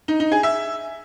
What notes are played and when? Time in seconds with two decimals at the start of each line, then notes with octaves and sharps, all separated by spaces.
0.08 D#4
0.20 D#4
0.32 G#4
0.43 E5